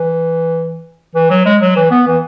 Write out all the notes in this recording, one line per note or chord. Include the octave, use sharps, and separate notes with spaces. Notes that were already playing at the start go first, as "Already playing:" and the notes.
Already playing: E3
E3
F#3
G#3
F#3
E3
B3
E3